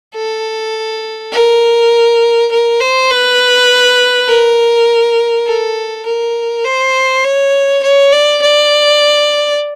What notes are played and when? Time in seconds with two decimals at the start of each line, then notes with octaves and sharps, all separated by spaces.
0.14 A4
1.33 A#4
2.51 A#4
2.80 C5
3.10 B4
4.28 A#4
5.47 A4
6.06 A#4
6.64 C5
7.24 C#5
7.83 C#5
8.12 D5
8.42 D5